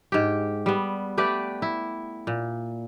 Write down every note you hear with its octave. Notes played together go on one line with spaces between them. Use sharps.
G#2 G4
G3 B3
A3 G4 B4 D5
E4
A#2